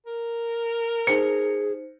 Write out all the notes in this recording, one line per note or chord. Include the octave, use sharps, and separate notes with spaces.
A#4
D#4 G#4 C5 C#7